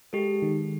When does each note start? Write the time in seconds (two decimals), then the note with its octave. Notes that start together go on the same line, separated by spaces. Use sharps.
0.13 G#3 G4 A4
0.42 D#3